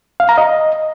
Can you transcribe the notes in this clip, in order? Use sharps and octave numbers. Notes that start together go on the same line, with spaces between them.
F5
A#5
D#5